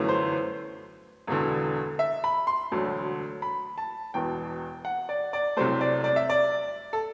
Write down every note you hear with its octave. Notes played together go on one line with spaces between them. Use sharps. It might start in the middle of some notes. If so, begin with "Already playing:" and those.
Already playing: G1 F#2 E3 A3
C5
E1 E2 D3
E5
B5
C6
E1 D2 D3 F#3 A3
B5
A5
E1 E2 B2 G5
F#5
D5
D5
C2 C3 F#3 A3 C5
D5
D5
E5
D5
A4